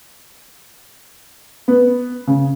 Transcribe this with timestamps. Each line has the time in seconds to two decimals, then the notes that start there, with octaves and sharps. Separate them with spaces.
1.68 B3
2.27 C#3